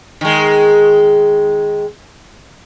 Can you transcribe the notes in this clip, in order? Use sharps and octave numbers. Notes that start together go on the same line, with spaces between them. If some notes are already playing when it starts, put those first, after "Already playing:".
D#3 G#3